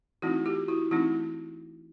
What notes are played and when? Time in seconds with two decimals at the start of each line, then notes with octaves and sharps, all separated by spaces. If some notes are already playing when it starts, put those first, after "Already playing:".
0.22 E3 A3 C4 D#4 E4 F#4
0.46 F4 G4
0.68 E4 F#4
0.91 E3 A3 C4 D#4 E4